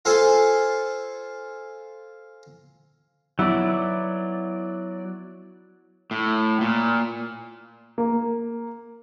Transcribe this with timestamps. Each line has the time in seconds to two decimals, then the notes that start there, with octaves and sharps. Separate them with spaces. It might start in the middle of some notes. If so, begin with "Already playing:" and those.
0.05 F4 A4 C5 G#5
3.39 F#3 B3 E4 D5
6.11 A2
6.61 A#2
7.98 A#3